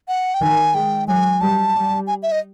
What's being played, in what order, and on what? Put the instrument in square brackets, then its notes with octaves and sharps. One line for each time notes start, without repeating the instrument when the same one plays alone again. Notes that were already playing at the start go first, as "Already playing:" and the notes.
[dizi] F#5
G5
[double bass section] D#3 [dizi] G#5
[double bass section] G#3 [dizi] G5
[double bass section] F#3 [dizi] G#5
[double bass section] G3 [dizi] A5
[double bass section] G3
[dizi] G#5
E5
D#5